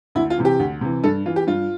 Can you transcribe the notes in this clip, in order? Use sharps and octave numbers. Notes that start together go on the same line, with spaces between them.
D2 E4
F4
C3 E3
G4
D2
C3 E3
G2 A4
E3 F4
G4
G2 F4